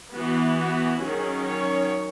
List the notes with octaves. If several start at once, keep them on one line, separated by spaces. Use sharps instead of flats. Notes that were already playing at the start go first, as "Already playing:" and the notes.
E3 B3 F#4
F#4
D#3 F#3 C#4 G#4
C#5